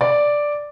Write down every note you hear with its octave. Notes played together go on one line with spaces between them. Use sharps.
D5